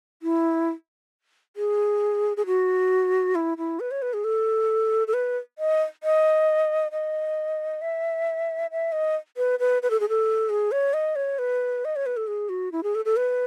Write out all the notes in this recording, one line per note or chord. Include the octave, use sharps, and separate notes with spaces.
E4
G#4
G#4
F#4
E4
E4
B4
C#5
B4
G#4
A4
A4
B4
D#5
D#5
D#5
E5
E5
D#5
B4
B4
B4
A4
G#4
A4
G#4
C#5
D#5
C#5
B4
D#5
C#5
B4
A4
G#4
F#4
E4
G#4
A4
A4
B4